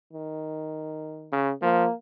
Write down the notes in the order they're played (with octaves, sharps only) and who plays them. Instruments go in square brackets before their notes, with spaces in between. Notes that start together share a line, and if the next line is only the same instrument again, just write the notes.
[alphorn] D#3
[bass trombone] C#3
[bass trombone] F3 [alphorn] A#3